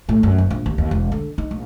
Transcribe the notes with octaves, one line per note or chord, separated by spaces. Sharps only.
A2
F#2
F#1
A#1
D#2
D#2
E1
D3
D#4
A#1